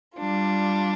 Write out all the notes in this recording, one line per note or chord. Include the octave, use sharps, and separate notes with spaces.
G3 D4 F4